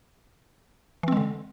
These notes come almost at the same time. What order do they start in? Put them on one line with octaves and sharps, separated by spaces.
E3 C4 G#3 D3